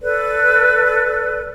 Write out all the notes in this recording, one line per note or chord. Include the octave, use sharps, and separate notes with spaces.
A4 B4 D5